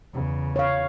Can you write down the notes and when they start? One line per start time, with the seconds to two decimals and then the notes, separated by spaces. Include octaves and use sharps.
0.14 E2 C#3
0.56 C#5 F5